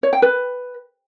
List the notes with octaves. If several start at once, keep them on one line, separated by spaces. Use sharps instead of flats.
C#5
G5
B4